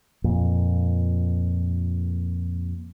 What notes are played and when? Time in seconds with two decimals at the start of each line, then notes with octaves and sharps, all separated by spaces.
0.24 F2 A#2